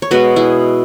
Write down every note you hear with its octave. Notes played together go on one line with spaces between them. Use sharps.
C#5
B2 G#3 B3 F#4 B4
E4 G#4